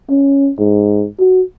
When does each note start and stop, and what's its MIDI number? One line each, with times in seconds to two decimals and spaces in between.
0.10 0.50 61
0.59 1.06 44
1.19 1.42 66